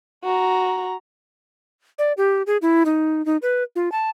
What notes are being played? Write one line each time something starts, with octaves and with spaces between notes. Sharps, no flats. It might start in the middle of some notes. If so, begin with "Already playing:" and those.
F#4 A#5
D5
G4
G#4
E4
D#4
D#4
B4
F4
A5